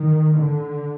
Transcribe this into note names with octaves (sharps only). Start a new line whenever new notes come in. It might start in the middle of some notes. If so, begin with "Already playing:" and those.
Already playing: D#3
D3